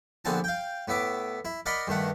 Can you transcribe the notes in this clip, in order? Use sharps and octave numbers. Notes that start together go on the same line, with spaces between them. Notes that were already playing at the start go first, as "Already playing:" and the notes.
A#1 D3 B3 C4 G#5 A5
F5 G5
A2 B3 E5 D6
E4
A#4 D5 D#5 F#5 B5 C6
G2 D#3 A3 F#5